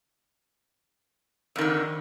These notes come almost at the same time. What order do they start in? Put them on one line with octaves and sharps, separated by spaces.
F2 D#3 D3